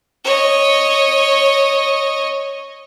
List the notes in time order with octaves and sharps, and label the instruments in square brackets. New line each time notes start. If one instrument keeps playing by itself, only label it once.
[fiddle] C#5 D#5